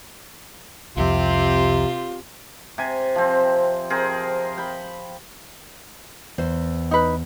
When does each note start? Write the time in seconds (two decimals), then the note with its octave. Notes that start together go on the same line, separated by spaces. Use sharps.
0.97 C2 F2 C3 C4 F4 G4
2.78 C3 G#5
3.16 F3 C4
3.90 C4 G#4 A#4
4.58 G5 B5
6.38 E2 C5
6.91 D#4 B4